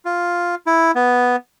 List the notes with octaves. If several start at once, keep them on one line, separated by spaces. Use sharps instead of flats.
F4
E4
B3